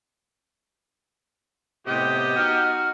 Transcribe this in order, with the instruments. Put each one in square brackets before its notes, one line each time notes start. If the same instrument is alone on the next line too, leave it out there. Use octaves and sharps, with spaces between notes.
[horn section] A2 C3 [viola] B3 D#5 [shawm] G4
[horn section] D#4 F#4 [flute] F6